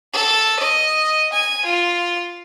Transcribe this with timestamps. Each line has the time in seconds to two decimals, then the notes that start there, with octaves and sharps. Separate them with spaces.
0.13 A4
0.59 D#5
1.32 G#5
1.65 F4